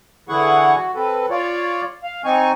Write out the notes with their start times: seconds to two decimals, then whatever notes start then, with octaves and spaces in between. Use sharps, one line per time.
0.29 D3 E3 E4 G#4 F#5 C#6
0.77 F#4
0.95 C4 A4 B4
1.30 F4 C#5 D5
2.03 F5
2.24 C4 D#4 G#5 C#6